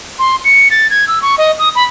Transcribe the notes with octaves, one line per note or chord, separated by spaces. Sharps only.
C6
C#7
A6
G#6
E6
C#6
D#5
D#6
B5